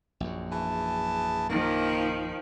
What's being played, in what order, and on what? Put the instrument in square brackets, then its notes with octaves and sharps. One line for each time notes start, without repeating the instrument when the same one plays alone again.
[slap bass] A#1 F#2
[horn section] E3 G#4 A5
[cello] D#3 F3 [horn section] A#3